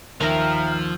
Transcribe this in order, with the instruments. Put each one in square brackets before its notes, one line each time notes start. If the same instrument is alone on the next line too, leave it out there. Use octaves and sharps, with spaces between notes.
[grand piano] D#2 [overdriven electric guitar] F3 [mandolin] A#4 A#5 [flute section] E5 G5 F6